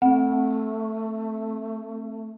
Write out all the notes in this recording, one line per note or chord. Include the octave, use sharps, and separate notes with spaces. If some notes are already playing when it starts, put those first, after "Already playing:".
A3 C4 F#5